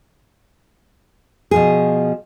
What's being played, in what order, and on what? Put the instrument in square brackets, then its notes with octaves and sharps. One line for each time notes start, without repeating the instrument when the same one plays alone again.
[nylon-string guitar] B2 F3 G#4